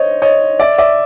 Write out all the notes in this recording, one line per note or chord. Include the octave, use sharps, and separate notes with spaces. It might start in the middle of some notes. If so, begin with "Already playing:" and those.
Already playing: C5 C#5 D#5
C#5 D#5
D5 E5
D5 E5